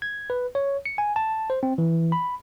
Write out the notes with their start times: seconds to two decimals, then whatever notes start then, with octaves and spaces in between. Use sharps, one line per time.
0.02 G#6
0.30 B4
0.55 C#5
0.86 C#7
0.98 G#5
1.16 A5
1.50 C5
1.63 C4
1.78 E3
2.12 B5